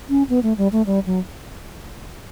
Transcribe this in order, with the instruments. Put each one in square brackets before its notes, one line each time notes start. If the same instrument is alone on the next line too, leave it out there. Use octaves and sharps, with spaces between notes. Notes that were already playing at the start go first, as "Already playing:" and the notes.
[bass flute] C#4
B3
A3
G3
A3
G3
F#3